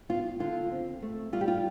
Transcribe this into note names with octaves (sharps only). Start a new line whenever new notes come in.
B3 F4
D3 F4
C4
A3
G3 F4
G4
F4